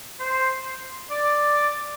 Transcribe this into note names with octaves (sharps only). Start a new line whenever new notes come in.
C5
D5